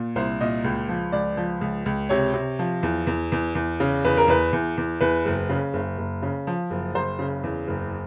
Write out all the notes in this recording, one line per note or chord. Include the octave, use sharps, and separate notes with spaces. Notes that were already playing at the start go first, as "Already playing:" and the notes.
Already playing: A#2
C2 C5
A#2 D#5
C#2
F3
C#2 D5
F3
C#2
C#2
C3 C#5
C3
F3
E2
E2
E2
E2
C#3
E2 B4
A#4
E2 B4
E2
E2
E2 B4
F#1
C#3
F#1
F#1
C#3
F3
F#1
F#1 C5
C#3
E2
F#1